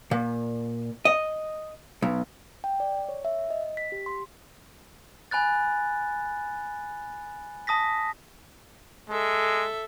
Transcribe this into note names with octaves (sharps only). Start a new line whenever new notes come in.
A#2
D#5
B1
G5
D5
C#5
E5
D#5
B6
G4
C6
G#5 B5 F#6 A6
A5 D#6 A#6 B6
G#3 A4 E5